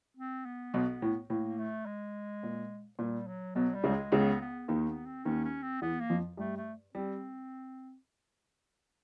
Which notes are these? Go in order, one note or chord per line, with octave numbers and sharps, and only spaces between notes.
C4
B3
B1 B2
A2
A2 A#3
A3
G#3
A#2
A#2 G3
F#3
B1 B2 F#3
G3
C#2 C#3
G#3
C#2 C#3 B3
B3
D#2 D#3 A#3
B3
C4
D#2 D#3 C#4
C#4
C4
E2 E3 B3
A#3
F2 F3
G2 G3 A3
A3
G3 C4